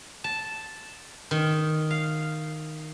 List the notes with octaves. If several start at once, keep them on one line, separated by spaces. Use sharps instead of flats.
A5
D#3
F5